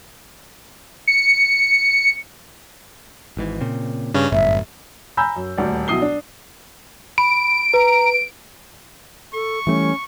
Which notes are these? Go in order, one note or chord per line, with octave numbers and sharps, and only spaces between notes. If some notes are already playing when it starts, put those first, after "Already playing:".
C#7
G#1 G#2 E3
A#2 C#3 C4
G2 C#3 C#4
G1 F#2 A2 E5
G#5 A#5 B5 E6 G6
F#2
D#1 D2 D5
B1 B2 E4 D#6 C7 G7
D4
B5 D7
B4 A#5
A4 C#6
E3 G3 A3 C#4